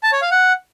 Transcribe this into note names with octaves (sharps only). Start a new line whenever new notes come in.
A5
C#5
F5
F#5